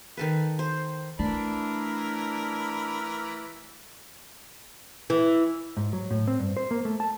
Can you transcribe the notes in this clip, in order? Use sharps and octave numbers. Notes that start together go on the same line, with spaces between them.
D#3 A4 B4
C5
E3 A3 D4 A#4 B5
E3
G#2
F#3
A2
C4
G2
C5
A#3
A3
A5